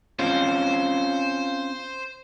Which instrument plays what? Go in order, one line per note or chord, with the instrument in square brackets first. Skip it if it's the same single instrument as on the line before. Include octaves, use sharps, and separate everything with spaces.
[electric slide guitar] C4 C#4 F4 [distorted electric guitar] C5